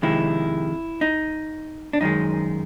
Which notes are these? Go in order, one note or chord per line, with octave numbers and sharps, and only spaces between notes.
F2 C3 D#3 G#3 E4
D#4
D4
F#2 D#3 G#3 D#4